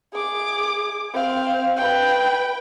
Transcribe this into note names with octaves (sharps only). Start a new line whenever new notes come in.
G#4 D6
C4 F5
B4 G5